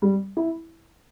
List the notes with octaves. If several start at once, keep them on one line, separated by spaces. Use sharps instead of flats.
G3
E4